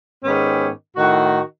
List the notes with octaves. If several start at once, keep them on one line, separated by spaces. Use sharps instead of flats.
G#2 D#3 B3 C#4 G4
A2 D#3 F#4